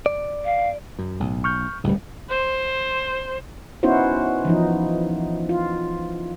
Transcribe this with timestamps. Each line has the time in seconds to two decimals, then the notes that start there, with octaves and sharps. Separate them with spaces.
0.06 D5
0.45 F5
0.99 F#2
1.20 B1 A2
1.44 C#6 F6 G6
1.84 D1 C#2 A2 G3
2.29 C5
3.83 B3 C#4 D#4 E4 F#4 C5
4.45 E3 F3 D#4
5.49 F4